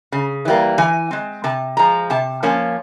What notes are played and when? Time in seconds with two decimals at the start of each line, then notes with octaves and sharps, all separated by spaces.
0.12 C#3
0.45 E3 G3 A#3
0.78 E3 G#5
1.11 G#3 C4
1.44 C3 A5
1.77 F3 G#3 A#5
2.10 C3 A5
2.43 F3 A#3 C#4 A5